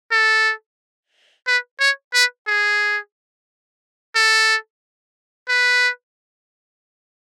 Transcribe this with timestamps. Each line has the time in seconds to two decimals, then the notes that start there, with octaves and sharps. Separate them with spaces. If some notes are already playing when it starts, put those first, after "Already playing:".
0.12 A4
1.47 B4
1.80 C#5
2.14 B4
2.47 G#4
4.16 A4
5.49 B4